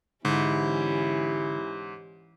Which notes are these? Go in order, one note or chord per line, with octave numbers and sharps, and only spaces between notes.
G#2 D3 E3 C#4 E4 G4